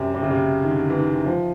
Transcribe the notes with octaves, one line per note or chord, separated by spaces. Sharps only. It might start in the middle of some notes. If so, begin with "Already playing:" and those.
Already playing: F#2 C3
C3
C#3
C3
D#3
D3
E3
D#3
F3